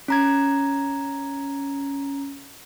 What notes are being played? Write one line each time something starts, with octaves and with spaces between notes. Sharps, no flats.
C#4 A#5 G#6